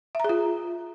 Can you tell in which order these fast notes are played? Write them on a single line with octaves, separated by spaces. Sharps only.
E5 A#5 G#4 F4